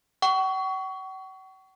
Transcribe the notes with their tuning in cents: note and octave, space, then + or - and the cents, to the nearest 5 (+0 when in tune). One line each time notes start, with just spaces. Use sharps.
F#5 +45 C#6 +20